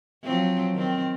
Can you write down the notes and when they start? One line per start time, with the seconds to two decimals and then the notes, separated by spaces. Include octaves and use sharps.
0.24 F3 F#3 C4
0.74 D#3 C4